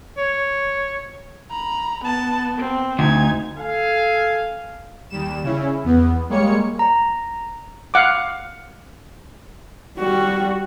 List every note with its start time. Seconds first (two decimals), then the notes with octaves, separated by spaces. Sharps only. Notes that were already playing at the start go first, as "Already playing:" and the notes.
0.17 C#5
1.51 A#5 B5
2.04 B3 A5
2.57 C4
2.99 D2 D#4 G#6
3.58 A4 F5 G#5
5.10 D#2 G3 E7
5.43 C#3 C#4 E4
5.84 E2 B3
6.29 G3 G#3 A#3 C#5 C#7
6.79 A#5
7.94 F5 F#5 D6
9.98 G3 F#4